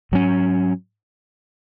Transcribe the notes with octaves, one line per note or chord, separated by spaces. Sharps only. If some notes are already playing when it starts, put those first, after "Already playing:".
G#2 F#3 C#4